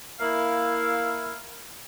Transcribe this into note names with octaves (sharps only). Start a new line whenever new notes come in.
A#3 E4 F5